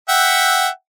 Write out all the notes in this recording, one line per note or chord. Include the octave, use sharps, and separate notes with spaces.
E5 F#5 G5